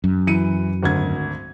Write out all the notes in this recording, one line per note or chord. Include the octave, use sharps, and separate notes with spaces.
F#2
E3 C#7 D#7
G#1 D2 G#6